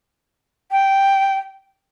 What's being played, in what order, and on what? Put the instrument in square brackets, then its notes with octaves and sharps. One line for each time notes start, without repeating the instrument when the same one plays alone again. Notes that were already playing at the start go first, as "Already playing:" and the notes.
[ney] G5